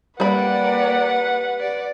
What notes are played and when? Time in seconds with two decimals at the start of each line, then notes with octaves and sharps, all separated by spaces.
0.20 G3 A#3 B4 D5 F#5 B5
1.60 D5